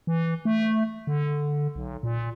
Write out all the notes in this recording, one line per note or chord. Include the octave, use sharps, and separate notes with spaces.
E3
A3
D3
B1
A#2